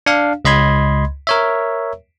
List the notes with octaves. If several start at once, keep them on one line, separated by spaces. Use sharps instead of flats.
D4 F5
C#2 D#5 B5 C6 G#6
A#4 C#5 E5